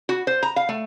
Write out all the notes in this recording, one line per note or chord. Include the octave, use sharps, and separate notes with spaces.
F#4
C5
A#5
F5
A3